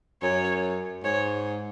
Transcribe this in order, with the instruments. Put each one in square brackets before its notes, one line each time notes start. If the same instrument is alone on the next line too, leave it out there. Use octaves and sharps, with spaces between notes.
[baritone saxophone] F#2 [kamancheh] C#5
[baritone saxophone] G#2 [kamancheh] C#5